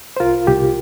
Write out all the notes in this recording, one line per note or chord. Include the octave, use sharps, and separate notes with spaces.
C5
C2 F4 A#4
C2 G4